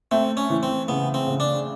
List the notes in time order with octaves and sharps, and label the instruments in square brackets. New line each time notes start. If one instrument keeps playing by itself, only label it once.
[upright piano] A3 [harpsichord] C4
[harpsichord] C#4
[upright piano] E3
[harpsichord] C4
[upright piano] C#3 [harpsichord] B3
[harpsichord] C4
[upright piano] C#3
[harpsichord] D4